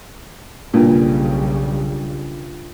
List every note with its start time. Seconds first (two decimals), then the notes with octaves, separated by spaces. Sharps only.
0.74 B1 G2 A#2 C#3 G3